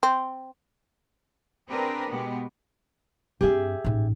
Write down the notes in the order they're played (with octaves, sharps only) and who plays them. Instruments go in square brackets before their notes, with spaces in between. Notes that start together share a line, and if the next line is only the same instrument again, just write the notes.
[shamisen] C4
[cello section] C4 D4 G4 G#4 A#4 B4
B2 G#3 B3 G4
[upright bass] G2 C4 [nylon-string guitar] G4 G#4 E5
[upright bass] A1 G#2